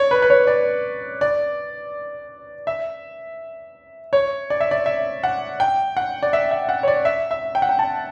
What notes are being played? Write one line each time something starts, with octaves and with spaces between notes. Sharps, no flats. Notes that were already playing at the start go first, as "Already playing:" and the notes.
Already playing: C#5 D5
B4
B4
C#5
D5
D5
E5
C#5
D5
E5
D5
E5
F#5
G5
F#5
D5
E5
E5
F#5
C#5
D5
E5
E5
G5
F#5
G5
A5